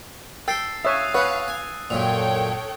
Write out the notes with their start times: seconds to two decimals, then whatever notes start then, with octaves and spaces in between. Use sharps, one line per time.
0.48 A4 G5 E6 A6 C7
0.85 C#5 E5 F5 D#6 F#6 D#7
1.14 C#4 B4 C#5 F#5
1.48 G#5
1.90 F#2 A#2 A4 C#5 G5 F7